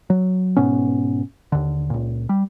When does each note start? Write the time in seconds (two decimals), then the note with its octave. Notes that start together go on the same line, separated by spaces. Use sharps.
0.10 F#3
0.57 G#2 B2 B3 C#4
1.52 D#2 D3
1.90 C#2 A#2
2.29 G3